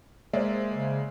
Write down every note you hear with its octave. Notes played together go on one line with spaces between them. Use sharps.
G#3 A#3 C5 D5 E5
C#3